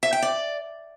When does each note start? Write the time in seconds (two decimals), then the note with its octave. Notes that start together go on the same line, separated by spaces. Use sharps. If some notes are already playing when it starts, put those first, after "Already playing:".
0.03 E5
0.13 G5
0.22 D5